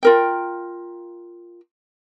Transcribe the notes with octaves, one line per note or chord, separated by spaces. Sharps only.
F4 A#4 G5